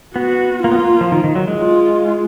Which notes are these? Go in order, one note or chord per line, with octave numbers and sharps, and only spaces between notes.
B3 F#4
A#3 F4
B3
A#3
F3
D#3
D#3
F#3
G#3
F4